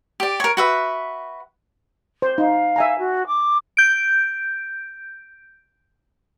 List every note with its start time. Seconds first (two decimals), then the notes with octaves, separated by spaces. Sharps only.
0.20 G4 D5
0.40 A#4 C#5
0.57 F#4 B4 E5
2.22 C5
2.38 D#4 F5
2.76 E5 G#5 A#5
2.98 F#4
3.26 D6
3.77 G6 D7